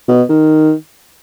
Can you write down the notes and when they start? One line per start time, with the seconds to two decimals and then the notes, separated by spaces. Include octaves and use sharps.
0.08 B2
0.29 D#3